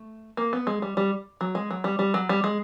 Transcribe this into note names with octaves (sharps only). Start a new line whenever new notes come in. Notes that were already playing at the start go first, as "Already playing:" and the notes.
Already playing: A3
A#3
B3
G#3
G3
G3
F#3
G#3
F#3
G3
G3
F#3
G3
G#3